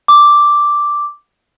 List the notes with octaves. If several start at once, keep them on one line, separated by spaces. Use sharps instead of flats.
D6